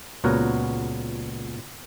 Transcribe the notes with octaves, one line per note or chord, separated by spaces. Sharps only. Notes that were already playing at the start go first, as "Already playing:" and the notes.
C#2 A#2 B3 F#4 A#4 C#5